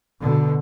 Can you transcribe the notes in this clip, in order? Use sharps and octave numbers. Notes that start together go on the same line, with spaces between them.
B2 D3